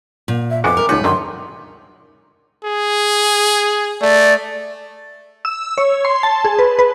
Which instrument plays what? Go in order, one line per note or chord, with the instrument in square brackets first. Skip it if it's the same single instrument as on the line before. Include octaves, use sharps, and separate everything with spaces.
[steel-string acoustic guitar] A#2
[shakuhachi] E5
[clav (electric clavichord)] F2 B3 F#4 [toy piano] C5 G#5 [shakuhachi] D6
[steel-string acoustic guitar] A#4
[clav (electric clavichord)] C#2 A#2 F#4 [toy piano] D#4 C#5 [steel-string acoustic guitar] B4
[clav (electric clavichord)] F#2 D3 D#3 [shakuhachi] C6
[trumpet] G#4
[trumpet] A3 [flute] D5
[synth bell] E6
C#5
C6
A5
G#4
B4
B4